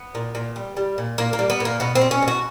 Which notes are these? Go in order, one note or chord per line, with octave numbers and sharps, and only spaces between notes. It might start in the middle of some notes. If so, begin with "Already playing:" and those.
Already playing: B3
A#2
A#2
G3
G3
A#2
A#2 A#3
A#3
G3
B3
A#2
A#3
B2 B3
C4
B2
C#4
B2
F#4